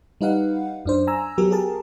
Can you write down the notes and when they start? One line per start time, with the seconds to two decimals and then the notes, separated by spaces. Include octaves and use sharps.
0.21 G3 D#4 B4 F5 F#5
0.85 F#2 D4 C5
1.07 G#5 A#5 E6
1.38 F#3 B3 G4 A#4
1.51 G4 G#4 A#4 A5